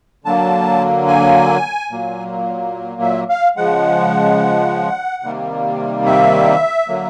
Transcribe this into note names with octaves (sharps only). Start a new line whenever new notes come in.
D3 F#3 A#3 A5
G#5
A#2 F#3 A#3
E5
F5
C#3 F3 G#3 F#5
C3 D#3 G3 A#3
E5
D3 F#3 A#3